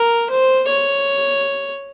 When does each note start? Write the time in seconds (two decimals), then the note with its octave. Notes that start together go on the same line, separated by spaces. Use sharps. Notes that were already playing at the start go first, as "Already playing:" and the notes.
Already playing: A#4
0.30 C5
0.68 C#5